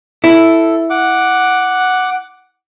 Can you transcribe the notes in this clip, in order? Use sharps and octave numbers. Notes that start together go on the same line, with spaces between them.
E4 A4
F#5 D6